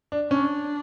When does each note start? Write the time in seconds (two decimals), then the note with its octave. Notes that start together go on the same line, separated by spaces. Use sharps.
0.12 D4
0.30 C#4 D4